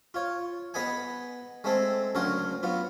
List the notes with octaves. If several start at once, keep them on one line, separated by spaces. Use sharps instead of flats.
F4 C#5
B3 G#4 B4 D#5 F#5 G#5
G#3 A3 C4 G#4 A4
D2 C#3 F#3 A#4 C#5 C6
F#3 B3 F4